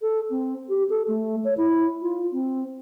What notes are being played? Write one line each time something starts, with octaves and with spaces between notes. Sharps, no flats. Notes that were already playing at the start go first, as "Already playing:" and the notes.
A4
C4
G4
A4
A3
C#5
E4
F4
C4